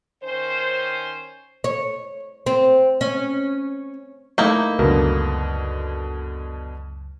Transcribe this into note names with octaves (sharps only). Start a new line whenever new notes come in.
D#3 C#4 C5
C#5
C4
C#4
A3 A#3 D#4 E4 D#5 G6
C#2 F#2 B2 D3 A#4